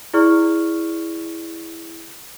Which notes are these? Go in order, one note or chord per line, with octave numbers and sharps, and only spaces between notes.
E4 G#4 D5 C#6 F6